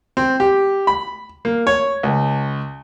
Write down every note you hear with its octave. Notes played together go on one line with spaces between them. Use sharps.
C4
G4
B5
A#3
C#5
C#2